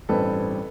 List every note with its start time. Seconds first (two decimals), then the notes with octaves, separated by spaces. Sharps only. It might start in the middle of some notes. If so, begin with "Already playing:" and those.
0.09 A1 G2 E3 G3 C4 A4 B4